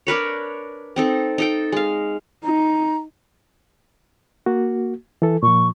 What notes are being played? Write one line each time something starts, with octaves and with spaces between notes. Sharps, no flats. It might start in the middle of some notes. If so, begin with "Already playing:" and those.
D4 A#4 B4 C#5
C4 D#4 A4
D#4 A4 G5
G#3 F5
D#4 A#5
A#3 F#4
E3 A4
A#2 F3 C#6